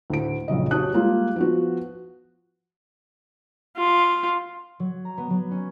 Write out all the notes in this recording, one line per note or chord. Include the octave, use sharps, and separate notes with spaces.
D2 A2 D7
A#1 F#2 C#3 D#5
F#4 G4 C#5 A5 D#6 F#6
G3 G#3 A#3 F4
F3 B3 F#4
F4
F#3
A#5
B3
F#3
C#4